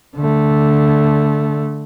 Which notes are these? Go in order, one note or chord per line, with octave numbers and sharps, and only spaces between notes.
D3 A3